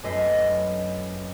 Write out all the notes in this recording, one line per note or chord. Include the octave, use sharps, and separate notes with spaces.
F#2 A3 B4 D#5 B5 C7